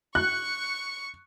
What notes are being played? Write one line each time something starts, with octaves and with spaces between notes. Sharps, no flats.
C#6 F#6 C#7